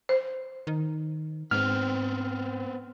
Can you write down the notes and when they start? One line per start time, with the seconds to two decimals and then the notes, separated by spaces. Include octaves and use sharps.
0.09 C5
0.67 D#3
1.51 G#2 B3 C4 F6